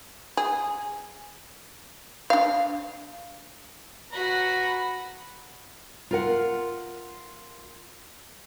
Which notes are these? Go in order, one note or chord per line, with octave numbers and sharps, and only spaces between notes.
G#4
D4 F5
F#4 B4 A#5 B5
F4 A#4 F#5